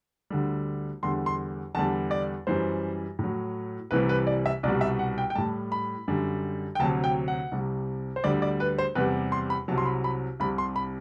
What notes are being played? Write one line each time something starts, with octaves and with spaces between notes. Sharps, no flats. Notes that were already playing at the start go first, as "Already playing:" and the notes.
D2 D3 G3
E2 D3 G3 C6
C6
E2 D3 G3 A5
D5
F#2 E3 G3 C5
A2 F#3
C2 C3 E3 G3 B4
B4
D5
E5
C2 B2 G3 D5
E5
F#5
G5
G5
A2 G3 A5
B5
F#2 D3 G3
G5
D2 C3 F#3 A5
G5
F#5
C2 C3 G3
C5
D2 D3 G3 D5
D5
B4
C5
E2 C3 G3 B4
C6
B5
C2 C3 F#3 A5
C6
B5
B5
C2 C3 G3 B5
C6
B5